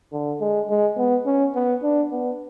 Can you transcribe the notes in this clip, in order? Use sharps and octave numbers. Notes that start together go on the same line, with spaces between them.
D3
G#3
G#3
B3
C#4
B3
D4
B3